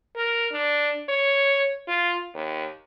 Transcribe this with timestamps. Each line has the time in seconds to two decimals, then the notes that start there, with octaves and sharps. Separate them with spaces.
0.16 A#4
0.53 D4
1.09 C#5
1.88 F4
2.35 D#2